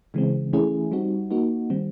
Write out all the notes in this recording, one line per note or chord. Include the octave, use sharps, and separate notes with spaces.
C#3 E3 G#3 C4
E3 A3 C#4 E4 G#4
G3 C4 D#4 F#4
A#3 D#4 F#4
D#3 G3 C4